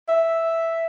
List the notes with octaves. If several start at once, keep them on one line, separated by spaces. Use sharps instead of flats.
E5